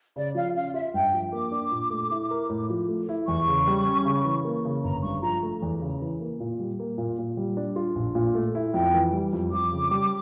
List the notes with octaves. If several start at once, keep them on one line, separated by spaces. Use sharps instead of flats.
C#3 D5
F3 F5
C#4 F5
F4 E5
G2 G5
F3
A#3 D6
D4
A#2
A3
E4
A#4
A2
F3
A3
E4
E2 C#6
C#3
G3
C#4
C#3
E3
A#3
C#3
G1 A#5
G2 C#6
F3 A#5
A3
E2
C#3
E3
A#3
A#2
G3
A#3
A#2
A#2
G3
D4
F4
A#1
A#2
A3
E4
F2 G5
E3
G3
F2
F2 D6
C#3
G3